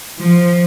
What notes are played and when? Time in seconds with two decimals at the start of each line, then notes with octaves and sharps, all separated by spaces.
0.21 F3